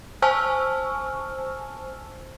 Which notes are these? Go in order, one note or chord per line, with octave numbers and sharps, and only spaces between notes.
C5 G#5 A5 C#6 E6 F6